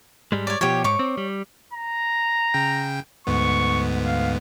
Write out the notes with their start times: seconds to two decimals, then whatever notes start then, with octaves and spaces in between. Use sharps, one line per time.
0.32 G#2 G3 G#3
0.47 C#5 D5
0.61 B2 F3 G4 C#5
0.84 G#2 C#5 C#6 D6
0.99 C4
1.18 G3
1.73 A#5
2.54 C#3 G5
3.27 D2 G#2 B3 C#6
4.06 F5